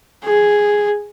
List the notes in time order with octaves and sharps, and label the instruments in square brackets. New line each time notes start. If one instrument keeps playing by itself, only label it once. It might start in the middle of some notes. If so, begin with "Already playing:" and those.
[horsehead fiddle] G#4